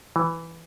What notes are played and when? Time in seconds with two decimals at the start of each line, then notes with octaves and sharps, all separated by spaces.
0.16 E3